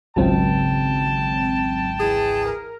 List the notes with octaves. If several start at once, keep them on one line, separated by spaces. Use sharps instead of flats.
G#1 C#2 F#3 C4 G5 A5
E3 G#4
A#4